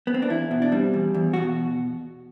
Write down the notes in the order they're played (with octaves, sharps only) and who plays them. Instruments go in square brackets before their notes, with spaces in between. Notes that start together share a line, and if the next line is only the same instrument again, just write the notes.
[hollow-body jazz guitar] B3
C4
D4
E2 E4
B2
D4
G3 C4
E2
E2
B2 F#4